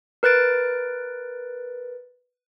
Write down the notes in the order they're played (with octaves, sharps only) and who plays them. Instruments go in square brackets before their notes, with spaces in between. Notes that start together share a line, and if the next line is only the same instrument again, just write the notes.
[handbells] A#4 B4 F#6 A6 D7